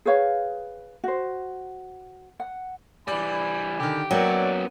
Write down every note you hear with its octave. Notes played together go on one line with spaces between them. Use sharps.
G#4 B4 C#5 F5
F#4 C5
F#5
E3 G3 D5 G#5 B5
D3 D#3 G4
F#3 A#3 B3 C#4 C#5 D5 E5 G5